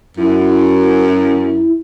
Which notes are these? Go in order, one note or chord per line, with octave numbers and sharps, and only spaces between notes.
F#2 E4